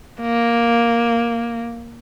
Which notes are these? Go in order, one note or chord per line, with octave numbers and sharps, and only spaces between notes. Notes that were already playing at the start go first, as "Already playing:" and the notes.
A#3